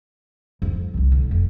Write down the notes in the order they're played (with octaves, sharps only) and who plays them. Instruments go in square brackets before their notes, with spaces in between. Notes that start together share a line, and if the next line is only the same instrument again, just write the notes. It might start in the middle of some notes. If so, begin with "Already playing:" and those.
[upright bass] F2
C2 D#3
B1
F1 F2